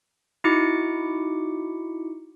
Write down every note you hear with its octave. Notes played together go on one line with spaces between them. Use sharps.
D#4 E4 F#4 D6 C#7